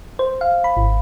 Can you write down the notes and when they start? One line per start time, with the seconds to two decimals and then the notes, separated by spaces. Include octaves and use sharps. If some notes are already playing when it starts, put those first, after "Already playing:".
0.19 C5
0.41 F5
0.64 B5
0.77 G#1